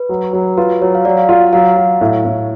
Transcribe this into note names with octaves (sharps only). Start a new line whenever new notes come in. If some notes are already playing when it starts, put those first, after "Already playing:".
Already playing: B4
F#3
F#3
F4 B4
F#3 C#5
F5
F#3 D5
F5
F4 F#5
F#3 F5
F#3
A2
A2